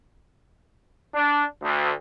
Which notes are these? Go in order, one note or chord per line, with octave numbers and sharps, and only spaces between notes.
D4
D2